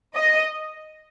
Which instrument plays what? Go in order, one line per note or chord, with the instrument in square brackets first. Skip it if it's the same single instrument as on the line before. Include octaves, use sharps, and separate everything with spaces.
[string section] D#5